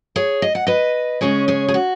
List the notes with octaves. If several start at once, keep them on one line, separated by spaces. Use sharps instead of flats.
G#4 C#5
D#5
F#5
B4 D#5
C#3 G#3 C#4 G#4 C#5
G#4 C#5
G#4
F#4